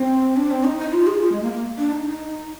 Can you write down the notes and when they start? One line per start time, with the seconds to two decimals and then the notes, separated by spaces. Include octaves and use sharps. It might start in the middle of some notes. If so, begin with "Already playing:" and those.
Already playing: C4
0.36 D4
0.51 C4
0.64 D#4
0.79 D#4
0.93 F4
1.07 G#4
1.21 F4
1.32 G#3
1.43 A#3
1.53 A#3
1.78 D4
1.92 D#4
2.06 D#4